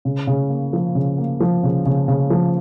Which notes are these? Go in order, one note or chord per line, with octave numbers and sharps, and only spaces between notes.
C#3
C#3
A#3
F3
C#3
A#3
F3
C#3
C#3
C#3
F3